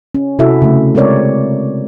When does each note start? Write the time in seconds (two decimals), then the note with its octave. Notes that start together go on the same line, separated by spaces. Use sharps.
0.15 C#4
0.39 C3 E4 F#4 A4 E5
0.62 C#3 A3
0.95 G#3 C4 A#4 C#5 D5